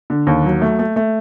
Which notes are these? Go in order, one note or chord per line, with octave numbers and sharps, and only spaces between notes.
D3
D#2
F#3
A3
A3
A3